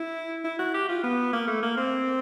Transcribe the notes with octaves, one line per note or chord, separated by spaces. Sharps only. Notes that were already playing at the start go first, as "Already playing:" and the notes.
Already playing: E4
E4
F#4
G4
F4
B3
A#3
A3
A#3
C4